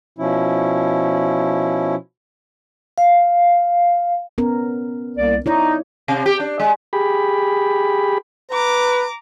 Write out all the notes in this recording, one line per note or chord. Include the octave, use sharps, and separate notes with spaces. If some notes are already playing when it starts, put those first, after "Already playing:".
B2 F3 C#4 E4
F5
B3 C#4 A#4
C2 A#3 D5
D#4 E4 C#5 D5
C3
G4
D4
G#3
G4 G#4 B5
B4 A#5 D6